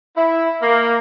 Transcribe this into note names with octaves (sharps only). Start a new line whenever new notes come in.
E4
A#3